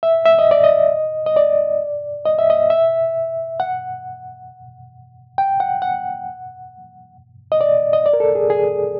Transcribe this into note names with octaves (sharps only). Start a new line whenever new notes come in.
E5
E5
D#5
D5
D#5
D#5
D5
D#5
E5
D#5
E5
F#5
G5
F#5
F#5
D#5
D5
D#5
D5
A#4
A4
G#4
G#4